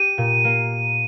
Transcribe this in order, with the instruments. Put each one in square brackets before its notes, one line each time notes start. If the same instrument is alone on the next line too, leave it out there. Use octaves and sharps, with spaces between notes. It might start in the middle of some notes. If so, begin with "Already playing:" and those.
Already playing: [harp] G4 [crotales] D#7
[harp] A#2
A#3